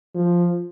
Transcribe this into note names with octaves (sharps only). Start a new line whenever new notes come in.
F3